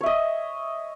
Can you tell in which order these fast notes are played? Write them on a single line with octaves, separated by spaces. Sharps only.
C#5 E5 D#5